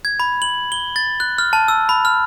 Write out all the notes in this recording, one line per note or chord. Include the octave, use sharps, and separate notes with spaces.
G#6
B5
F#7
G7
A6
F#6
F6
A5
E6
B5
F6